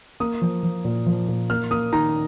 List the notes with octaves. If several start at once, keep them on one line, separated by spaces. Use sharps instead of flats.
A#3 D#6
F3
F3
A#2
F3
A#2
A#3 F6
A#3 D#6
D#3 A#5